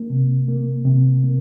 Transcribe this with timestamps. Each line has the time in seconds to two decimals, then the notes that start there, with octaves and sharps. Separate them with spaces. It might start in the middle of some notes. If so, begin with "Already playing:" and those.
Already playing: A#3
0.10 C3
0.48 A#3
0.85 C3
1.24 A#3